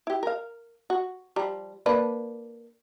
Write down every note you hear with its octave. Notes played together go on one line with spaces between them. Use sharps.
E4 G4
A#4 F5
F#4
F3 G3 A#5
A#3 D4 B4